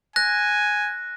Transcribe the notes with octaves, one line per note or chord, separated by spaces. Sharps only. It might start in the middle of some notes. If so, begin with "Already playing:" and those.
G#5 F#6 A#6